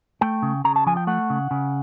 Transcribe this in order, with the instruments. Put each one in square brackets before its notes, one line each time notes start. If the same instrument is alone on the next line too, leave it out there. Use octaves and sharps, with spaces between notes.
[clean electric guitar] A3 G5
C#3
C#3 A#5
A5
F3 G#5
G5
A3 F#5
C#3
C#3